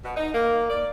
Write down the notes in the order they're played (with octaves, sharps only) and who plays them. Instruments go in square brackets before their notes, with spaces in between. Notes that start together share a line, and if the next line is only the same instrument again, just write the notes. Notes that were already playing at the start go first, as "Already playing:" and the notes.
[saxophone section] B2
D#4
A#3
D5